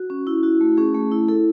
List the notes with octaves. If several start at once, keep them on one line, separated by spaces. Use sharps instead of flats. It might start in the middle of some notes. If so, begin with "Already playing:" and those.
Already playing: F#4
C#4
E4
E4 F#4
A3
C#4 G#4
A3
E4
E4 A4